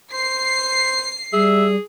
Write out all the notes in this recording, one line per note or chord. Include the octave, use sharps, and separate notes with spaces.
C5 C7
G3 G#4 E5